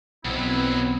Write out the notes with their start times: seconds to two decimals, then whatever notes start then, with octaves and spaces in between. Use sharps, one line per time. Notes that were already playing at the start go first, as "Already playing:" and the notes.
0.25 B1 F2 F#3 B3 C4 E4